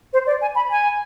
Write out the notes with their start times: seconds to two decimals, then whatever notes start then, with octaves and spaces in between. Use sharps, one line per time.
0.13 C5
0.26 D5
0.41 G#5
0.55 B5
0.70 G#5